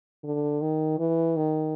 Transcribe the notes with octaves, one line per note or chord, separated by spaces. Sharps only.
D3
D#3
E3
D#3